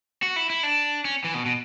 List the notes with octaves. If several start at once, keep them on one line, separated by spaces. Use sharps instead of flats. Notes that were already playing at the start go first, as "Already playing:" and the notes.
F#4
E4
E4
D4
C#4
E3
B2
B2